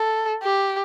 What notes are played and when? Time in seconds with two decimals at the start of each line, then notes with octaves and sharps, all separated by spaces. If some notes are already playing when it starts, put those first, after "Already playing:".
Already playing: A4
0.43 G4